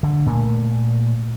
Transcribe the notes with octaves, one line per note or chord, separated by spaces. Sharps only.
D3
A#2 A3